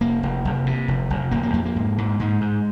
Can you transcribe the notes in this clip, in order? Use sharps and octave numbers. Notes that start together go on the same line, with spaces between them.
F1 A#3
F1
F1
C3
F1
F1
F1 A#3
A#3
F2 A#3
A#3
G#2
G#2
G#2 G#3
G#2